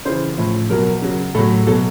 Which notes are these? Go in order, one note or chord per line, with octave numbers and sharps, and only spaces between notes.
C#3 E3 C5
A2 F3
B2 F#3 A#4
C#3 F#3
A2 F#3 A4
B2 F#3 A4